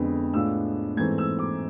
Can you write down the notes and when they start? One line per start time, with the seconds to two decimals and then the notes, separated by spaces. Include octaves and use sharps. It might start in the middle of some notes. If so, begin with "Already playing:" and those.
Already playing: F2 D3 G#3 B3
0.34 A2 G#3 B3 D4 F4 E6
0.97 G#2 E3 A3 C4 G#6
1.18 E6
1.39 D6